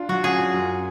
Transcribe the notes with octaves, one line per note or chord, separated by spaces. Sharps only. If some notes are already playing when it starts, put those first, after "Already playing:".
Already playing: D4 F4
F#3 F#4
C#4 G#4
F4
F#2